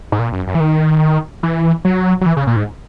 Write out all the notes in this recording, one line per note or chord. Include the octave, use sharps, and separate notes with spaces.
G#2
A#2
F#2
F#2
E3
D#3
E3
F#3
F#3
E3
C#3
A#2
G#2